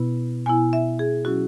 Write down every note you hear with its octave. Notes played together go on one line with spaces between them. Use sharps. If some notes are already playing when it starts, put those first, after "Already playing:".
Already playing: B2 B3 E4
B2 B3 E4 G#5
E5
G#4
F#3 C#4 E4 F#4